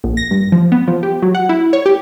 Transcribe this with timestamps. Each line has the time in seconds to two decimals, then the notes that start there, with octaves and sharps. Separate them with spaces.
0.04 A#1
0.17 A#6
0.31 G2
0.52 F3
0.72 B3
0.88 F3
1.03 G4
1.22 F#3
1.35 F#5
1.49 E4
1.73 C#5
1.86 G4